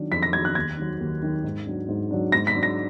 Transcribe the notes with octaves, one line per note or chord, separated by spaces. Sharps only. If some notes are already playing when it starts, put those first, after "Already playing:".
Already playing: D#3 F#3 D4
F2 B6
A#6
D#3 F#3 D4 G#6
F#6
D#2 G#6
D#3 F#3
D#2
D#3 F#3
G#2
F#3 D4
G#2
F#3 D4
G#2 A#6
B6
F#3 D4
A#6